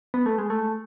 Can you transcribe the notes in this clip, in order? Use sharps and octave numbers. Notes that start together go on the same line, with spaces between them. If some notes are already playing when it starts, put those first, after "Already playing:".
B3
A3
G#3
A3